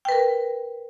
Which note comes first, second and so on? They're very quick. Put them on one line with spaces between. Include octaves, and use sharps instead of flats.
G5 B4 A#4